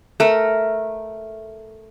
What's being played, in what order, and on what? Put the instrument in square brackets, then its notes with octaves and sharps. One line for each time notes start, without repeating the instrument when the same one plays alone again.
[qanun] A3 A#4